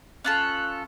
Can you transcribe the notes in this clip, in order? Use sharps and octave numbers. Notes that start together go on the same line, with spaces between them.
C#4 F4 A4 F#6